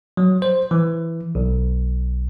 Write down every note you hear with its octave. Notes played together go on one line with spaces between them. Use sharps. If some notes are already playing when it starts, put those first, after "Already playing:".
F#3
C5
E3
B1